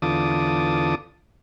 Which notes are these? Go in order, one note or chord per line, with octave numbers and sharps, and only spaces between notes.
E2 D3 F4 A5 D6 D#6